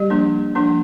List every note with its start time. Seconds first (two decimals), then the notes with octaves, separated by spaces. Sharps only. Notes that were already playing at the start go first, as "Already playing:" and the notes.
Already playing: G3 G4
0.10 F3 A#3 D4
0.55 F3 A#3 D4